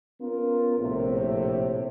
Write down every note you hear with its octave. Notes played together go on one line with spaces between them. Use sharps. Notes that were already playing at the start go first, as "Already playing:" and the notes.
B3 C#4 F4 A#4
A#1 A2 C3